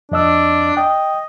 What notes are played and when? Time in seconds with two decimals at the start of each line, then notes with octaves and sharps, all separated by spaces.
0.12 F2 D4 D#5 E6
0.77 D#5 G5